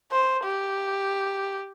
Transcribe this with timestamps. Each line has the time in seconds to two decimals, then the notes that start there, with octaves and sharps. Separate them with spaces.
0.11 C5
0.44 G4